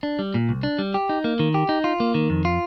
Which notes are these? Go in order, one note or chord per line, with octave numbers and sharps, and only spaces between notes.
D4
G3
A#2
C2
D4
G3
G4
D#4
A#3
D#3
G4
D#4
F4
A#3
D#3
F2
F4